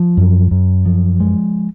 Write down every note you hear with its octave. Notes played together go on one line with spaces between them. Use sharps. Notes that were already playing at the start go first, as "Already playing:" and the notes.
Already playing: F3
F#2
F#2
F3
G#3